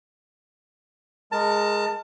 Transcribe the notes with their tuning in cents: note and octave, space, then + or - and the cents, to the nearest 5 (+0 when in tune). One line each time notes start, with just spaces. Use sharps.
G#3 +0 A#4 +0 A5 +25